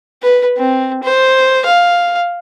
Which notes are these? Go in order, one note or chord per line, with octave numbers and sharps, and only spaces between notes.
B4
C4
C5
F5